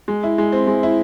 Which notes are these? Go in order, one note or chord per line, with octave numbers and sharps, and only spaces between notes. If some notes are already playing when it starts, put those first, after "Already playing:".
G#3
E4
G#3
C4
G#3
E4